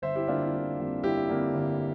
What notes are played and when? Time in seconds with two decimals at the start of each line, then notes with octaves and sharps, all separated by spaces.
0.02 G1 C5 E5
0.15 E4 G4
0.28 F2 D3 G3 A#3 D4 F4
0.41 E4
0.53 G1 E4
0.79 F2 D3 G3 A#3
1.03 G1 E4 G4
1.29 F2 D3 G3 A#3
1.54 G1